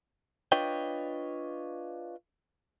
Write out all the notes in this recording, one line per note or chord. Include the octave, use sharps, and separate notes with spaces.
D4 F4 B4 C#5 D#5 G5